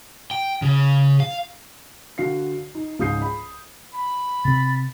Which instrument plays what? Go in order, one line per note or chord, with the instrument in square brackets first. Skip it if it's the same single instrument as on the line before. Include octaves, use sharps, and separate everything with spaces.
[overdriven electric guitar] G5
C#3
F5
[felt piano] D3 F#4 F5 C7
D#4
C#2 G#2 F5 D#6 G6 C7
B5
[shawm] B5
[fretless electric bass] C3 C4 [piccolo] A6